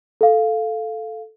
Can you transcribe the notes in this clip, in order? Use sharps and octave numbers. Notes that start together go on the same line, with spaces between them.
A4 F5